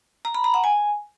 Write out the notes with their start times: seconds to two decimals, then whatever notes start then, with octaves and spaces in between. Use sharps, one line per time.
0.25 A#5
0.35 B5
0.44 A#5
0.54 F#5
0.64 G#5